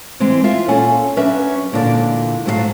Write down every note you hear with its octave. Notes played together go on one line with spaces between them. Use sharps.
E3 G#3 C4
F4 E5 F5
A#2 C#4 A4 F#5 G#5
F#3 C#4 D4 B4 E5
E2 A#2 D3 G#3 G#4 D5
G#2 F#3 A3 F#4 A4 F5